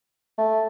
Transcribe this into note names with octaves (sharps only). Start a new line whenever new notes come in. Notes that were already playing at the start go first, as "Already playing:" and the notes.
A3